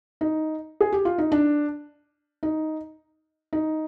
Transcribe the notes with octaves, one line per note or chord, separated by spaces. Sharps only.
D#4
G#4
G4
F4
D#4
D4
D#4
D#4